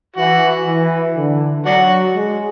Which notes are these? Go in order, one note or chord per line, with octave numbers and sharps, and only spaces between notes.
E3 F#4
E3
D3
F#3 D4 F#4
G#3